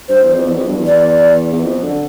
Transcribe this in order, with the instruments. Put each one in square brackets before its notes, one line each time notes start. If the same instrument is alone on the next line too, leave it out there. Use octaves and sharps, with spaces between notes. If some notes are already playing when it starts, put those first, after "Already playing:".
[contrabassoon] G2 [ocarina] C5
[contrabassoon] E2
F2
E2
F2
G2
E2
[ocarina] D5
[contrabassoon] E2
F2
D3